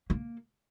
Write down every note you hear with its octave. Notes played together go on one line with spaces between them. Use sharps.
A#3